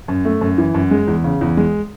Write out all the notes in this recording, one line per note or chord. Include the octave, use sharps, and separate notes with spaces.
F#2
A3
F#2
E3
F#2
G#3
E2
C#3
E2
G#3